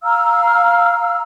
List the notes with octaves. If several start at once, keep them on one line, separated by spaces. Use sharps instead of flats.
F5 A#5 E6 F6